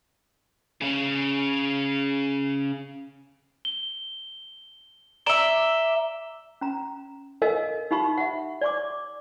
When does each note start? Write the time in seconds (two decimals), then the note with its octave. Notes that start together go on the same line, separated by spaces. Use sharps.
0.81 C#3 C#4
3.65 G7
5.26 D5 E5 A#5 E7 G7
6.61 C#4 A#5
7.42 A4 A#4 D#5 F5 G#5
7.91 D#4 G4 F5 B5 C#6
8.18 E5 F#5
8.61 D5 G#5 C#6 D6